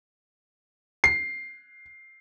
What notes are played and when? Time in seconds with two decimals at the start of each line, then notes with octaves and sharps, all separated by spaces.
1.04 C7